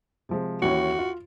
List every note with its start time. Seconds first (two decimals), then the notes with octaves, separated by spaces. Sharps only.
0.29 C3 F3 G#3
0.62 D#2 E3 C#4 F#4
0.99 F4